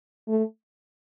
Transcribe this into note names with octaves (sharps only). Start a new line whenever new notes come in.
A3